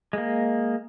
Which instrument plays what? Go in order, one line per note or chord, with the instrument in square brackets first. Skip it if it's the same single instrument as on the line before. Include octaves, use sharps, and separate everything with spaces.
[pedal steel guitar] G#3 A#3